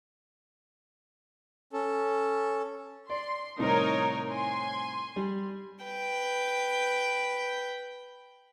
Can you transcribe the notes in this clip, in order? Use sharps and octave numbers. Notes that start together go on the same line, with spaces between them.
C#4 A4
D5 C6
C2 A2 D#3 D#4 A#4 C#5
G#5 C6
G3
B4 G5